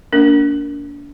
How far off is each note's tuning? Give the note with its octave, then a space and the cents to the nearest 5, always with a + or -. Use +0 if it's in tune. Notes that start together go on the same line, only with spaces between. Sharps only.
A#3 +0 D4 -35 A#4 +0